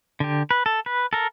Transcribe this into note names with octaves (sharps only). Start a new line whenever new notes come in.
D3 G4
B4
A4
B4
A4 A#4